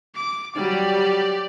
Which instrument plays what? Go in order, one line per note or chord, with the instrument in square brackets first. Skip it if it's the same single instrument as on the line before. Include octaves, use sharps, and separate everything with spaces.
[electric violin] D6
[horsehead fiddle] F#3 G3 [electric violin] G4 D5